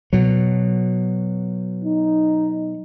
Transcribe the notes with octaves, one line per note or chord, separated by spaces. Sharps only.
B2 F#3
D#4